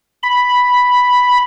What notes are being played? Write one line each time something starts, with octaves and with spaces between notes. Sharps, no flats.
B5